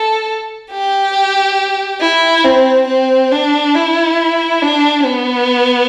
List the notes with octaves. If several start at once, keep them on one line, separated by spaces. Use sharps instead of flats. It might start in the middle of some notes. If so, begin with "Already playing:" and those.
Already playing: A4
G4
E4
C4
C4
D4
E4
D4
B3